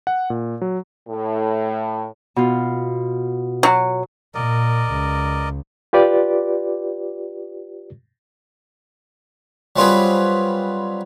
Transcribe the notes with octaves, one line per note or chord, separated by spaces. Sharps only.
F#5
A#2
F#3
A2
B2 F4
F#3
A#2 A#4 D5 D#5
C#2
F4 G4 B4 D5
F#3 G3 C4 F4 G#4 B4